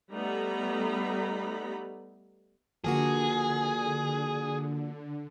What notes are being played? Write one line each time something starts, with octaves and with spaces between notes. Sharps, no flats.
G3 A3 B3 D#4 A#5 B5
D3 F3 A#3 F#4 G#4